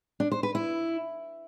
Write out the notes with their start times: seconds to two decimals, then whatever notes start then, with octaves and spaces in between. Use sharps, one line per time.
0.20 D4
0.32 C5
0.43 B4
0.55 E4